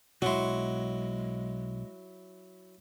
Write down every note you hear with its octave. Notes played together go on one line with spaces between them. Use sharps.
B1 F#3 G#3 E4 F#4 C6